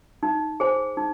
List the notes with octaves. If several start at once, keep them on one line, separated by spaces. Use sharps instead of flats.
D#4
G#4 C5 G#5
D#4